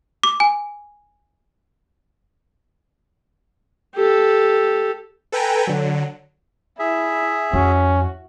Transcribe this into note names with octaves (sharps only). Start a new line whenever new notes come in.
D6
G#5
G4 A4
A4 B4 G5 G#5 A#5
D3 F#3
E4 G#4 E5
F2 C#4 F#4